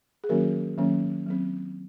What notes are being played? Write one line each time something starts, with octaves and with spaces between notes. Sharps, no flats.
G#4
D#3 F#3 A#3 C#4 F#4 A#4
D#3 F#3 A#3 C#4
F#3 C4